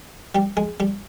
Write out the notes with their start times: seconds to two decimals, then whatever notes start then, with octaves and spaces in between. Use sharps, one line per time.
0.35 G3 G4
0.57 G#3 G#4
0.80 G3 G4